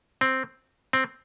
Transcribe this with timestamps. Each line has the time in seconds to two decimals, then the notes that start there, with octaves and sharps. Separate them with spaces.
0.21 C4
0.93 C4